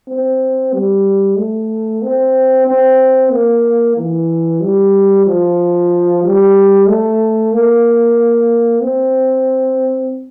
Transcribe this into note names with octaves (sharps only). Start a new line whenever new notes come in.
C4
G3
A3
C4
C4
A#3
E3
G3
F3
G3
A3
A#3
C4